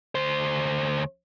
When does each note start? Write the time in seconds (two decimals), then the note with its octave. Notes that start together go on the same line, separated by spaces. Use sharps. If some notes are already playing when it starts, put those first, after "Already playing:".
0.15 D2 C5